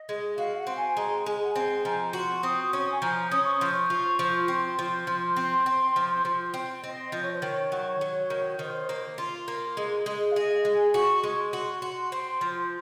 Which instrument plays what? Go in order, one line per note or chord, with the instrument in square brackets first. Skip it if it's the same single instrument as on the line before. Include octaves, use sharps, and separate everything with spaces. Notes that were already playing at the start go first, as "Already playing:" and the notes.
Already playing: [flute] D#5
[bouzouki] G#3
[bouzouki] F#4 [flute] F5
[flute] F#5
[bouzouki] C4
[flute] G#5
[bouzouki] G#3 [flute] A#5
[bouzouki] G#3 [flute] G#5
[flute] F#5
[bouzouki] C4 [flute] G#5
[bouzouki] F3 [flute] A#5
[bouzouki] F#4 [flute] C6
[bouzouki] C4 [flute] D#6
[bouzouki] C#4 [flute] C#6
[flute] G#5
[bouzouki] F3 [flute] A#5
[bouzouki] C#4 [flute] D#6
[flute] C#6
[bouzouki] F3 [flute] C6
[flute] C#6
[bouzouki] F4
F3
[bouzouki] C4 [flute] C6
[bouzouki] F3
F3
C4
C4
F3
F3
C4
[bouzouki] C4 [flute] D#5
[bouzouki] F3 [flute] D#5
[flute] C#5
C5
[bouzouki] D#3 [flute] C#5
[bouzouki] F#3
F#3
D#3
[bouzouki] D#3 [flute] C5
[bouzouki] A#3
F4
A#3
G#3
G#3
[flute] F5
[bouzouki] G#4 [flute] D#5
[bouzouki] G#3
[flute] G#5
[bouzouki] F#4 [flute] C#6
[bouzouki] G#3 [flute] C6
[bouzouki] F#4
F#4
[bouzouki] C4 [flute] C6
[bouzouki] F3